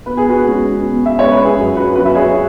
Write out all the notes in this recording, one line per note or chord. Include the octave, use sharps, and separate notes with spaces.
B2 B4
G#4
F#4 B4
G#3 C#4
B2
E5
G#3 C#4 C#5
B4
G#4
F#2 F#4
F#4 B4
F#3 C#4 F#4 B4
E5
G#4 C#5
F#4